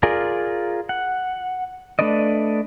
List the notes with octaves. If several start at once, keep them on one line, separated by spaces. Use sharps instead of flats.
F4 G#4 A#4 D5
F#5
A3 D4 B4 D5 D#5